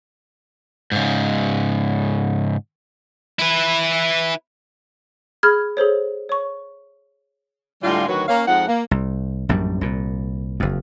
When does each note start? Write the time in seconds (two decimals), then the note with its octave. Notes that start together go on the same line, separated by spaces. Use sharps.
0.92 G#2 C#3
3.39 E4 B4
5.43 G#4 B5 F6 G#6
5.77 G#4 A4 C5 C#5
6.29 C#5 C#6
7.83 A2 D3 G3 G#3 F4
8.08 D2 D#3 F#3 F#4 B4 C#5
8.28 A#3 C#4 F5
8.47 F2 F3 G#3 D#4 F#5
8.68 A#3
8.91 C2
9.49 A#1 F#2 A2 G3
9.81 C2 A#2
10.60 F#1 F2